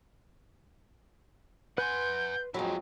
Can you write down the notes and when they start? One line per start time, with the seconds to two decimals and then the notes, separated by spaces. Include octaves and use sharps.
1.78 B4 F#5 G#5 C6 G6
2.54 F2 F#3 G#3 E4